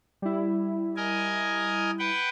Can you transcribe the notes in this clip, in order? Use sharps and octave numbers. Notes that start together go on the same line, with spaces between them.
G3 E4
A#4 D#5 G#5
B4 F#5 G5